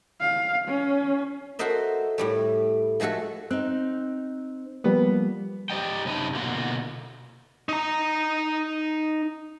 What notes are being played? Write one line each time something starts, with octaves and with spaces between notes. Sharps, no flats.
F5
C#4
F#4 A4 A#4 C5 D#5 E5
A2 G3 A3
F3 G#3 A3 F#4 A4
C4 D#4 F#6
F3 G3 A#3 B3
G4 C5 D5 D#5 G5
F#2 C3 D4 D#4 B4
B2 D3 A#3 F4 F#4
D#4 A#5